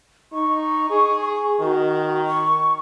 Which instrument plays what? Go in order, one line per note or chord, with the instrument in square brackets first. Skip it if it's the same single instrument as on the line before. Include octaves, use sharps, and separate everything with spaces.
[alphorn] D#4 [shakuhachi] C#6
[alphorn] G#4
[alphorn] D#3 [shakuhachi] F#4
[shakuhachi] C#6